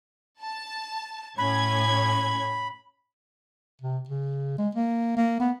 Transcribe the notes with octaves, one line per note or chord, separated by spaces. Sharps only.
A5
A2 C#4 B5 G#6
C3
C#3
G#3
A#3
A#3
B3